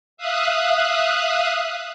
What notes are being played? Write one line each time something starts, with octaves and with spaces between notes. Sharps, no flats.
E5 F5 D#6 F#6